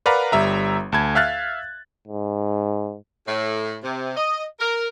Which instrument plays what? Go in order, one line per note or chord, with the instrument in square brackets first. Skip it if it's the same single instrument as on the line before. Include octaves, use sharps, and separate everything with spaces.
[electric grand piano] A#4 B4 D5 F5 F#5 A#5
G1 G3 E5 A#5
D2 A5 B5 G#6
E5 F5 F6 F#6 A6
[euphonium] G#2
[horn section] A2
C3
D#5
A#4